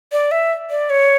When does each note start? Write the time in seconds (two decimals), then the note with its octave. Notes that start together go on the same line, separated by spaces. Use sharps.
0.12 D5
0.31 E5
0.70 D5
0.90 C#5